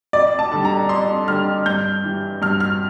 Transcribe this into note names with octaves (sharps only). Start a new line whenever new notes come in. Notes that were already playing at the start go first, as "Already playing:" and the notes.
F2 D5
A5
D3 G3
A#5
F2 C6
D3 G3 F6
G2 G6
E3 G3
G2 F6
F6